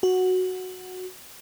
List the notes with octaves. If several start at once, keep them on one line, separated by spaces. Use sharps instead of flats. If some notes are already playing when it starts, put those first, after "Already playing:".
F#4